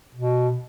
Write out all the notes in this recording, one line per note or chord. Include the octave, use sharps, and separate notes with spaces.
B2